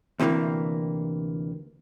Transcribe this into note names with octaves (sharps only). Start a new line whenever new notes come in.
D2 C3 E3 G#3 A#3